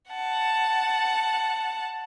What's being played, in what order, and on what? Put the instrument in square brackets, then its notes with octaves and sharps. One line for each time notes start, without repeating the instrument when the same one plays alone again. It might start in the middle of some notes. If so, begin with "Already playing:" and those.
[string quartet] F#5 A5